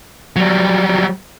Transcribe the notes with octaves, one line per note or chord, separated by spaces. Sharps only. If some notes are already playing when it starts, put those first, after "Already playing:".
F#3 G3